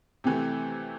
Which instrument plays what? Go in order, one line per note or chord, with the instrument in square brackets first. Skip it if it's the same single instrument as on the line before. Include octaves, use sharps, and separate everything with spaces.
[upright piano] C3 E3 A3 [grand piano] C4